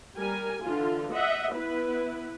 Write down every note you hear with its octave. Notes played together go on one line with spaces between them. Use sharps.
G3 A#4 G#5
D3 E3 F4
D#5 E5 F#5
B3 E4 B4